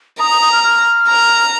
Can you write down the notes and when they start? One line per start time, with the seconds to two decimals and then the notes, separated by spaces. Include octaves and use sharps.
0.20 A#5 D#6
0.31 D#6
0.41 D#6
0.52 F6
0.64 F6
1.08 A#5